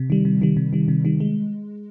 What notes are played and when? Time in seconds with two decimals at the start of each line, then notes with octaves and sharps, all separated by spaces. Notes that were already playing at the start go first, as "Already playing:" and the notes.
Already playing: C3
0.10 D#3 G3
0.25 C3
0.42 D#3 G3
0.57 C3
0.73 D#3 G3
0.88 C3
1.05 D#3 G3
1.20 G#3